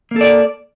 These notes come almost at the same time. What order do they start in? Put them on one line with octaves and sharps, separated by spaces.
A#3 A4 D5